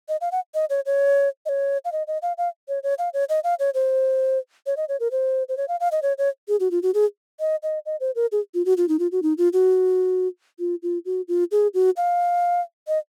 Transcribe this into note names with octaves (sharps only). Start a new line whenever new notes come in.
D#5
F5
F#5
D#5
C#5
C#5
D#5
C#5
F5
D#5
D#5
F5
F5
C#5
C#5
F5
C#5
D#5
F5
C#5
C5
C#5
D#5
C#5
A#4
C5
C5
C#5
F5
F5
D#5
C#5
C#5
G#4
F#4
F4
F#4
G#4
D#5
D#5
D#5
C5
A#4
G#4
F4
F#4
F4
D#4
F4
F#4
D#4
F4
F#4
F4
F4
F#4
F4
G#4
F#4
F5
D#5